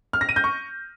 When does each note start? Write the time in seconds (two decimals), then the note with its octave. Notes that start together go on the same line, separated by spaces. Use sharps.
0.13 F6
0.21 A#6
0.29 D#7
0.36 G6
0.44 C#6